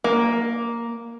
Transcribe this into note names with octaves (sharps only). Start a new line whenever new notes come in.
A#3